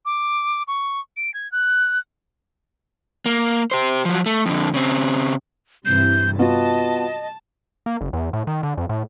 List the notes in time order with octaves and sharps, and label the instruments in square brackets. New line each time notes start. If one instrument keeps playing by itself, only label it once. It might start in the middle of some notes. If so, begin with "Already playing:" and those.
[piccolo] D6
C#6
D7
G#6
F#6
[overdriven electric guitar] A#3
G4 C5
F3 F#3
A3
F2 D3
C#3 C4
[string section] G2 C3 E3 [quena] G6
[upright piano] B3 F4 F#4 [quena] D#5 [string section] A5
[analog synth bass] A#3
F#1
E2
A2
D#3
D3
F2
A2